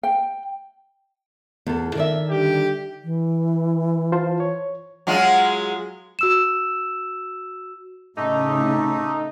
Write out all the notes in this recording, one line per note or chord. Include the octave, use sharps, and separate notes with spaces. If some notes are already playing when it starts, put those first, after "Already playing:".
G5
E2 A4
D#3 D5 E5
D3 G3 G4
E3
F4 C5 A5
C#5
F#3 G#3 F4
F#4 E6 E7
A2 C#3 A3 D#4 G4 A4